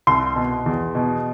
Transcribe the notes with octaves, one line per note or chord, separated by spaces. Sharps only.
C2 C6
B2
E2
B2